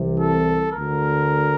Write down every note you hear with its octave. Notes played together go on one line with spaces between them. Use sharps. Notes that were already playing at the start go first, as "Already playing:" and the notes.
Already playing: C2 C3 E3
A4
D2 D3 A#4